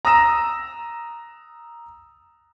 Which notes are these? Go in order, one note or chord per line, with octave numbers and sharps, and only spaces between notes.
A#5 D#6 E6 A#6 E7